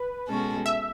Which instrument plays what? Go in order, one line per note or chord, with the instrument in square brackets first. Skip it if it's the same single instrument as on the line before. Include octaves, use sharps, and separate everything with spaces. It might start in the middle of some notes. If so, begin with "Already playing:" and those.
Already playing: [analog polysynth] B4
[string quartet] B2 G#3 C#4 F#4 A4
[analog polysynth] E5